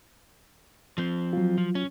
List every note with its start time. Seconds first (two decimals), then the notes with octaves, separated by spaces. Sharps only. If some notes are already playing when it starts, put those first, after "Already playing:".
0.98 F3 C4
1.33 F#3 F4
1.58 F3
1.75 C#4